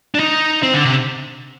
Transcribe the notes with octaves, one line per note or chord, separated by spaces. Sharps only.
D4
D#4
C4
D3
C3